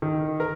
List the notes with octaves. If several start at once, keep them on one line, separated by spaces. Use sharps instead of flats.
D#3
A#4